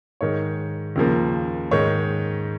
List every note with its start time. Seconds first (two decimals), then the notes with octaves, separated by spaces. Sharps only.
0.21 G#2 D#3 G#3 C#5
0.96 D#2 C#3 F3 A#3
1.71 G#2 D#3 G#3 C#5